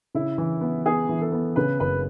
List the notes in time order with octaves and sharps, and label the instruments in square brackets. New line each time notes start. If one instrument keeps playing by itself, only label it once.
[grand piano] C#3 [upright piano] E4
[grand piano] E3
B3
[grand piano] B3 [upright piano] G#4
[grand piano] E3
[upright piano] A4
[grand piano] B3
[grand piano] C#3 [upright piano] B4
[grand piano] F#1 [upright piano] B4